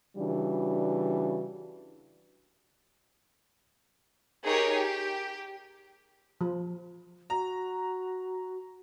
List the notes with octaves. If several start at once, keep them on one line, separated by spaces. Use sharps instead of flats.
C#3 E3 G3 D4 F#4
D#4 G4 G#4 A#4 C#5
G4
F3
F#4 A#5